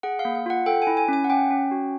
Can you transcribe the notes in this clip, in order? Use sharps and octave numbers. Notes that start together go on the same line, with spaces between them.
G#4 F#5
F5
A#3
F5
F4 F#5
A4 G5
G#5
E4
G#5
C#4 G#5
F#5
C#4 G5
C#4
F#4